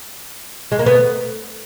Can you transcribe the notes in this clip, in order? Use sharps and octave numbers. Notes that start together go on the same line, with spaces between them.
G#3
A#3
B3